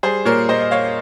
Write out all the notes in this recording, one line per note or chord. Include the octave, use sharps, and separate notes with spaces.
G3 G#4 C5
A#2 A#4 C#5
A#2 C5 D#5
D#5
A#3 C#5 F5